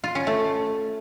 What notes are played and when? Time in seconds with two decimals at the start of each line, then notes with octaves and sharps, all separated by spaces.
0.04 F4
0.15 C#4
0.27 A3